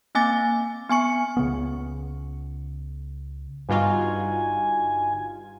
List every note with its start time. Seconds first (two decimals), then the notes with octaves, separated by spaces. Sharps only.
0.15 A#3 C4 G#5 D6 A6
0.90 B3 G#5 C#6 C#7
1.37 C#2 C#3 B3
3.69 G1 G2 D#4 F4 F#4 G#5